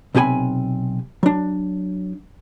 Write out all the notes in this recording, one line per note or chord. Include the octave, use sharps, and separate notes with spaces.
B1 C3 F4 G4 G#5 B5
F#3 D4